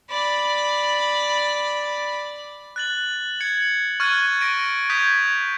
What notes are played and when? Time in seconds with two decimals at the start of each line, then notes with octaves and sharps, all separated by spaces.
0.10 D5 B5
2.76 F#6 A6 F#7
3.40 G#6 C#7 F#7
4.00 C#6 F6 F#6 G#6 A6 D#7
4.41 A#6 D7 D#7
4.90 D#6 G6 G#6 B6